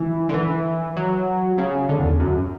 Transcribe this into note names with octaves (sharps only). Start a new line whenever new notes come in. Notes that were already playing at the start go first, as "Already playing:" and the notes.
Already playing: E3
D3
E3
F#3
C#3
D3
E2
F#2